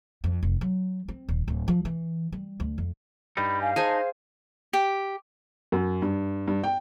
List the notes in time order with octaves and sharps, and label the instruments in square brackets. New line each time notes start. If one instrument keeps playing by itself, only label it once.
[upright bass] F2
F1
F#3
C4
D#1
D1
F3
E3
G3
D2
F2
[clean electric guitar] G2 G3 D#4 [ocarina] B5
[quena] F5 [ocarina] G#5
[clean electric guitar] D#4 [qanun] G#4 C5 G#5 [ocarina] A5
[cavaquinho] G4
[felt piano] F#2
G2
G2
G5